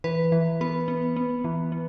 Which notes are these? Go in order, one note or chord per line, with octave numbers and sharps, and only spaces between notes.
E3 B4
E3
B3 B4
B3
B3
E3
B3